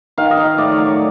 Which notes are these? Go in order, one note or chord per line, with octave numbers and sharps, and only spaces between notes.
D#3 F5
D#5
D#3
D#5
A2 D5
C#5
F#3
D5